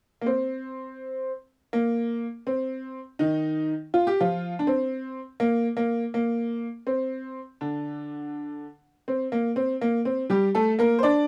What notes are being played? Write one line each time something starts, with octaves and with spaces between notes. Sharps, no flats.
A#3
C4
A#3
C4
D#3 D#4
F4
G4
F3 F4
D4
C4
A#3
A#3
A#3
C4
D3 D4
C4
A#3
C4
A#3
C4
G3 G4
A3 A4
A#3 A#4
C5
D4 D5